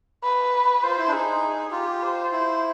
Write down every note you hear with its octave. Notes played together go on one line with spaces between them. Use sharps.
B4
F4 C5
E4
D4
D#4 G#4
F4 G4
C5
E4